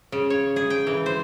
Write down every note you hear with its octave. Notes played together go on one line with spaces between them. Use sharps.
C#3
C#5
G#4
G5
E3
C5